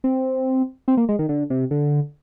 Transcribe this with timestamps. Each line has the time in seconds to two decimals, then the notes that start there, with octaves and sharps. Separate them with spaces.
0.04 C4
0.88 C4
0.97 A#3
1.09 G#3
1.19 D#3
1.29 D3
1.50 C3
1.71 D3